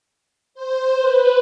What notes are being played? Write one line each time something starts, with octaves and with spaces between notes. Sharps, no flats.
C5
B4